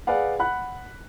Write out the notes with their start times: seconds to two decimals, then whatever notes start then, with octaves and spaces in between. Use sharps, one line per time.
0.07 G#4 B4 D5 F5 F#5
0.39 F#5 B5 F#6